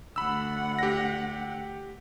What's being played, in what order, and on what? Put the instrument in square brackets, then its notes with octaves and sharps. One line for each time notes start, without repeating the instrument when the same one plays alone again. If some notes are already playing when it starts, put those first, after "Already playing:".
[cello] D2 F#5 [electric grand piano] B5 E6
[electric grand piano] G4 A#6